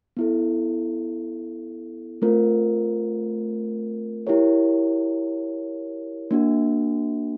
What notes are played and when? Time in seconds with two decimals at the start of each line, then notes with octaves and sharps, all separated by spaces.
0.17 B3 E4 A4
2.22 A3 C4 F4 A#4
4.27 E4 G4 A#4 C#5
6.31 A#3 D4 F#4